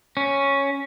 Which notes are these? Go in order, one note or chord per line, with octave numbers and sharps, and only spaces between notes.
C#4